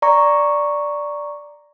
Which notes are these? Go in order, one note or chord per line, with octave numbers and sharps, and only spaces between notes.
D5 A#5 C#6